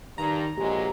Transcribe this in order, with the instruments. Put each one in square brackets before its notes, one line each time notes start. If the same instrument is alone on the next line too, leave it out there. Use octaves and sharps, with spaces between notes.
[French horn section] G2 [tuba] D#3 [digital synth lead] A#5
[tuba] A#1 [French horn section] A#2 F#3 G#3 [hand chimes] G4